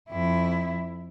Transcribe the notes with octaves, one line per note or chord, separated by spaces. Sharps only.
F2 E4